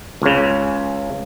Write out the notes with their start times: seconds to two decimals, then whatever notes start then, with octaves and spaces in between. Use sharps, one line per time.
0.22 C#2 C#3